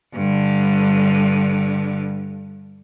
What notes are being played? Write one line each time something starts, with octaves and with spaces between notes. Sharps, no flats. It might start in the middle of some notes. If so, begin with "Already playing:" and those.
G2 D3